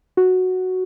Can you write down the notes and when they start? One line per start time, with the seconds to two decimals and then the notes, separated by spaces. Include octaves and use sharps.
0.17 F#4